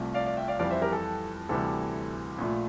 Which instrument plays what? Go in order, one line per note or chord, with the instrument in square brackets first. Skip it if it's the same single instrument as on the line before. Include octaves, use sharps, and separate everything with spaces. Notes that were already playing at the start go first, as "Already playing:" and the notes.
Already playing: [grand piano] C2 C3 F3 A3
D5 F5
D5 F5
E5 G5
D5 F5
F2 E3 G3 D5 F5
C5 E5
G4 A#4
A4
D2 C3 E3 G3 A4
A#1 A#2 A3